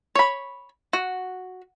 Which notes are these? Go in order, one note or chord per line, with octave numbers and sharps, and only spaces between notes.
C#5 B5
F#4